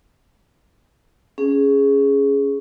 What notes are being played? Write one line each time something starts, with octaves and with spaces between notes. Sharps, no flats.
C#4 G#4